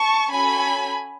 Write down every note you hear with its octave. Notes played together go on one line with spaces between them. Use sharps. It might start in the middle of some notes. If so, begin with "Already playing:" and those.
Already playing: A5 C#6
C#4 F#4 A4 G#5 B5